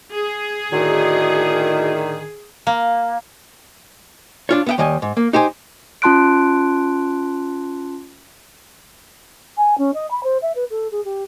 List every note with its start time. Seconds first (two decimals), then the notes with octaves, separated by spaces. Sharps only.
0.14 G#4
0.72 A2 D3 D#3 F#4
2.67 A#3
4.49 D4 F4 C#5
4.66 B3 E5 G5
4.78 D#2 D#3 G3 D#5 G#5
5.02 G#2
5.17 A#3
5.33 D#4 G4 C5 G#5
6.02 C#4 F4 A5 C6 F#6 D7
9.57 G#5
9.78 C#4
9.94 D#5
10.11 B5
10.24 C5
10.42 E5
10.55 B4
10.70 A4
10.92 G#4
11.05 G4